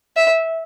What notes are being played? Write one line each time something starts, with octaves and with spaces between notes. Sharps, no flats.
E5